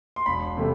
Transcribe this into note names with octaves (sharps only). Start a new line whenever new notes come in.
C6
E1 B5
C3 E3 A3